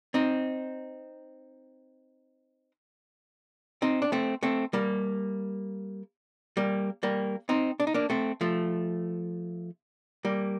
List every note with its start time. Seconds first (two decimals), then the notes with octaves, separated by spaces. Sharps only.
0.14 C4 D#4
3.82 C4 D#4
4.02 D4
4.12 A3 C4
4.43 A3 C4
4.73 G3 A#3
6.57 G3 A#3
7.03 G3 A#3
7.49 C4 D#4
7.80 D4
7.87 D#4
7.94 A#3 D4
8.10 A3 C4
8.41 F3 A3
10.25 G3 A#3